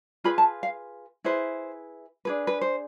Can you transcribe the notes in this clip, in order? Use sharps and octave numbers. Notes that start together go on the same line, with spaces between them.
F4 G#4 B4 B5
A5
F5
E4 G#4 B4 C5
D4 G#4 B4
B4
C5